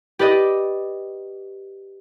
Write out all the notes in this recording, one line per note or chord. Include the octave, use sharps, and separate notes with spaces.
G4 B4 D5 D#5